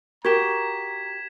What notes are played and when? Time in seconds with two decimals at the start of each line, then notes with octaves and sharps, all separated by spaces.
0.25 F#4 G4 A#4 A#5 G#6 B6 E7